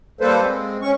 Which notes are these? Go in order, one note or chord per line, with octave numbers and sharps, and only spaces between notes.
G3 A#3 A4 B4 C5
G#3 C4
C#4 C#6